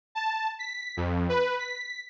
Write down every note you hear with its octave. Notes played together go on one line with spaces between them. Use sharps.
A5
B6
F2
B4
B6